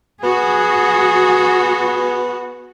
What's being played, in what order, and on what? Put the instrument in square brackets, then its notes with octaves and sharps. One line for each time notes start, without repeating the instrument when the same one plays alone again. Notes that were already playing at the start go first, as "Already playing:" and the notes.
[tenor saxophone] B3 [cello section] F#4 [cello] G#4